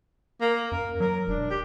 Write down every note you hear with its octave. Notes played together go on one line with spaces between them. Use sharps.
A#3
F#2 A#4
F#3 A#4
E1 D4
G4